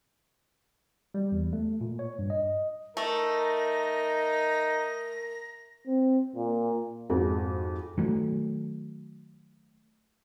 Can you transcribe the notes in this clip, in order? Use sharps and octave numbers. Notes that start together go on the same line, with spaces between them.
G3
E2
A3
A#2
C#5
G2
D#5
A3 D#4 A#4 A#6
C4
A#2
F2 G#2 G#3 F#4
D#3 F#3 A3